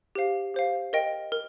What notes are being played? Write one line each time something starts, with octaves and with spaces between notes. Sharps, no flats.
G4 C5 F5
G4 C5 F5
A#4 D#5 G5
A#4